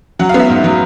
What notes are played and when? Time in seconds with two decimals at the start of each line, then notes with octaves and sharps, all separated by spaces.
0.19 F#3 F#5
0.29 F5
0.34 B3
0.39 E5
0.49 G#2
0.64 F#3